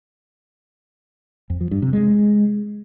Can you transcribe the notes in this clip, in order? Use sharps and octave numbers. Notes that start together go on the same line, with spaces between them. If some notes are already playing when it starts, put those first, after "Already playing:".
F2
F3
G2
C3
G#3